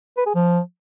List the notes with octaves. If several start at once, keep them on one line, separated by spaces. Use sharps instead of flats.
B4
G#4
F3